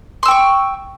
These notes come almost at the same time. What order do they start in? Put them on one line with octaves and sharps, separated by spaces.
C6 E6 G5 C#6